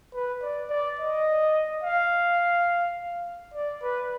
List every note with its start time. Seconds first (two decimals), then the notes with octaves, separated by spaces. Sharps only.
0.14 B4
0.41 D5
0.70 D5
0.99 D#5
1.84 F5
3.54 D5
3.82 B4